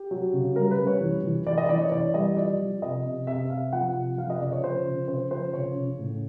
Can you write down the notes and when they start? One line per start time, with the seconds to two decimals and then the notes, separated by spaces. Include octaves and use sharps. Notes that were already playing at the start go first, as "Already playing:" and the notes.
Already playing: G4
0.11 F#3
0.33 C#3
0.56 G3 A#4
0.71 B4
0.79 G3
0.87 C#5
1.01 E3
1.24 E3
1.47 E3 D5
1.58 D#5
1.69 E3 D5
1.81 C#5
1.92 E3 D5
2.14 G3 D#5
2.37 F3 D5
2.60 F3
2.82 C3 D#5
3.05 C3
3.27 C3 E5
3.50 C3 F5
3.73 F3 F#5
3.95 C3
4.18 F3 F5
4.30 D#5
4.40 C#3 D5
4.52 C#5
4.63 F3 C5
4.86 C#3
5.08 C#3 C5
5.31 F3 C5
5.53 C#3 C#5
5.76 C#3
5.99 A2